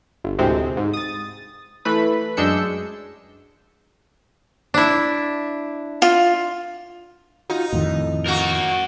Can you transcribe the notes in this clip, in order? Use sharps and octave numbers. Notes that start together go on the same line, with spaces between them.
G1
D2 A2 C3 G#3 C4
G#2
D#6 A6
E3 A3 B4 B5
F#2 G#3 D4 E6 G6 C#7
D4 E4
F4
D#4 F4 F#4
F2 A2 D#3
A#3 F#4 A#4 F#5